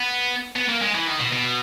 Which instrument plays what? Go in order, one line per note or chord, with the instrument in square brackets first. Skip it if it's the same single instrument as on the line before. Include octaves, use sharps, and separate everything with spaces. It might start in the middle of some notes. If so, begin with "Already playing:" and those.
Already playing: [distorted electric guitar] B3
B3
A#3
G#3
E3
D#3
B2
B2